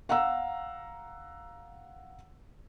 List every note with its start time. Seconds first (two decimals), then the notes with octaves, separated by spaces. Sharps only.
0.09 F5 F#5 A#5 E6